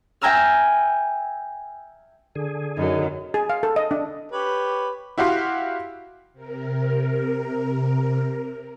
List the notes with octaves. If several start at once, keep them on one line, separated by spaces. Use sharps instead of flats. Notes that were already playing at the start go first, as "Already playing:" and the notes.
E5 G5 G#5 A#5 E6 F6
D3 G#4
F#2 F#3 D#4
G#4
F5
A4
D#5
D4
G4 B4 C#5
E4 F#4 G4 F5 C6
C3 A#4